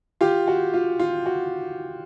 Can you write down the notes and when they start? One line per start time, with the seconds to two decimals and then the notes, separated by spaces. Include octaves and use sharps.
0.21 F4 G4
0.48 F#4
0.74 F4
0.99 F4
1.26 F#4